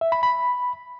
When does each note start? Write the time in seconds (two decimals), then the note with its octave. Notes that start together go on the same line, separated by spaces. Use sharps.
0.01 E5
0.12 B5
0.23 B5